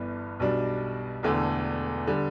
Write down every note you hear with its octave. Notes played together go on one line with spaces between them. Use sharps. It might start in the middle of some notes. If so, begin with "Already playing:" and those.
Already playing: G1 G2 E3 B3 D4
B1 B2 G3 D4
E1 E2 D3 A3
D3 G3